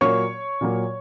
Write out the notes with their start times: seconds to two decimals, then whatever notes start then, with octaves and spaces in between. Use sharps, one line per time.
0.01 A#2 F#3 A#3 C#5 C#6
0.61 A#2 F#3 A#3